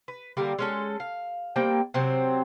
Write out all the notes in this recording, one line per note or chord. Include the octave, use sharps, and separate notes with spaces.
B4
D3 G3 A#3 A#4
G#3 C#4 A4
F5
G3 A#3 C4 G5
C3 F#3 C4